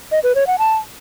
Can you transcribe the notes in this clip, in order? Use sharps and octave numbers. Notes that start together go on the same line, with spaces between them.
D#5
B4
C#5
F#5
A5